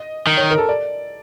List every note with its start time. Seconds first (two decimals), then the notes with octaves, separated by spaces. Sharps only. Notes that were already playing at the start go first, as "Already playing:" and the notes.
Already playing: D#5
0.27 D#3
0.37 C#5
0.51 A#4
0.58 A4
0.69 D5